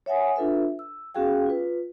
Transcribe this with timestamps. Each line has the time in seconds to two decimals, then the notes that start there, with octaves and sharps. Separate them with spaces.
0.06 C#5 E5 F#5 G#5 D#6
0.36 D4 F4 A4 B4 E5
0.79 E6
1.15 B3 C#4 F#4 G#4 F5 G5
1.46 F4 B4